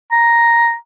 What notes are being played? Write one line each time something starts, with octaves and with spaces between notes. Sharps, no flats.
A#5